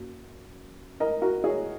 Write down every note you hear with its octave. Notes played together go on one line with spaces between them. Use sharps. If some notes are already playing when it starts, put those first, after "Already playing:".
Already playing: F#2 F#3 A#3
A#4 D#5
F#4 A#4
G#4 C#5